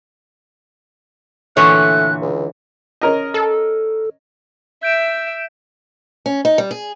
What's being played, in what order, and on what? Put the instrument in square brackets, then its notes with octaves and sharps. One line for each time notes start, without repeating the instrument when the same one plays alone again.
[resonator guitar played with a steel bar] A#2 C#5 [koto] D3 E3 [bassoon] A3 [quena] F#6
[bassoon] C#2
[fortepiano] C#4 A#4 D#5
[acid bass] A4
[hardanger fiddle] E5 [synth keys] G6 D7 E7
[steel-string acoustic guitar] C#4
D#4
G3
G#4